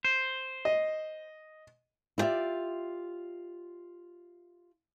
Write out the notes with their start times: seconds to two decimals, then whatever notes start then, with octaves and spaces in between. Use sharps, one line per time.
0.05 C5
0.65 D#5
2.18 E4 F4 G4 D5 E5